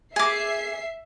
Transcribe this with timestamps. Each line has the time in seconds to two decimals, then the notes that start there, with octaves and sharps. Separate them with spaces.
0.16 G#4 E5 D6 C7